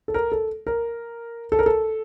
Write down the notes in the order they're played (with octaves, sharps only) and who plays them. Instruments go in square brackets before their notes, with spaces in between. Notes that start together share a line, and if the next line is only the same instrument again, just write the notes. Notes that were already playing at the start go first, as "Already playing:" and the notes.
[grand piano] A4
A#4
A4
A#4
A4
A#4
A4